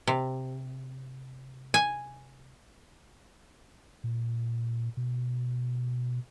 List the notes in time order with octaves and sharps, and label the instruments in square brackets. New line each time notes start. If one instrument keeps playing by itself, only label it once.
[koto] C3
G#5
[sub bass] A#2
B2